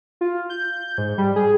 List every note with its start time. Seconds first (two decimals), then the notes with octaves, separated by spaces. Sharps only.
0.21 F4
0.50 G6
0.98 G#2
1.18 G3
1.36 G#4